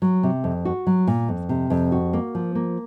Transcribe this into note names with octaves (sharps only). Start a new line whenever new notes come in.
F#3
C3
F2
F#4
F#3
A#2
F2
C3
F2
F#4
A#3
F3
A#3